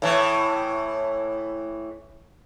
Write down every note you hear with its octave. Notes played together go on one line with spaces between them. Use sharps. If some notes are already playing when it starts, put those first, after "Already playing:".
A2 E3